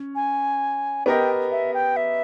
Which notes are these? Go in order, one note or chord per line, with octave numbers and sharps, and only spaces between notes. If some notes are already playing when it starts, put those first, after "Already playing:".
Already playing: C#4
G#5
B3 G4 A#4 D#5 G5
E5
G5
E5